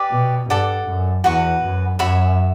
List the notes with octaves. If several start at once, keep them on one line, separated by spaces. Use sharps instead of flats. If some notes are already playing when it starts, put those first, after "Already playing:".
Already playing: G4 B4 D5
B2
G2 A4 D5 F#5
F#2
E2 F#4 B4 F#5 C#6
F#2
F#2 F#4 C#5 E5 B5